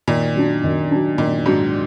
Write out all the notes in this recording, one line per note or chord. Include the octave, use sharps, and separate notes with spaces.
A#2 D#3
F#3 D4
D#3
F#3 D4
A#2 D#3
G#2 F#3 D4